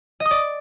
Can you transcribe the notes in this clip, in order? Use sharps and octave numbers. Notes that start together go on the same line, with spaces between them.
D#5
D#6
D5